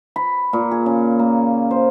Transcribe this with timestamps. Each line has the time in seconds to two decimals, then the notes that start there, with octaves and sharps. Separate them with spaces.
0.16 B5
0.53 A#2
0.71 G#4
0.86 C#3
1.19 A#3
1.71 C5